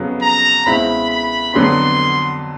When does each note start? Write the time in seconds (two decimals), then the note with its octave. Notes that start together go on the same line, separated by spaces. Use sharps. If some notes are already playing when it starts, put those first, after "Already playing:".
Already playing: F2 C#3 F#3 B3
0.22 A#5
0.66 C#2 B2 G#3 C4 E4 B5
1.11 B5
1.54 F2 D3 F#3 B3 D4 C6